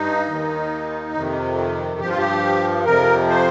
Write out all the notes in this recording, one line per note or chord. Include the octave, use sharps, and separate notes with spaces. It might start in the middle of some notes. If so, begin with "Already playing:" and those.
Already playing: G2 D#4
D#2 D#3
F2 C3 D#3
G2 F3 G4
F4
G4
F2 C3 F3 A#4
C5